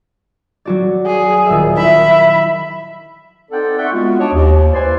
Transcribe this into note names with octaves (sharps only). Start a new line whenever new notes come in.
F#3 F#4 D5
G#4
D#1 E5
E4 E5 B5
C4 D#4 A4 D5 F#5 G5
D5 E5 F#5 G5 C#6
G#3 B3 F4 F#4
D4 D#4 C#5 D#5 A5 D6
D#2
E4 B4 C5 D5 G#5 C6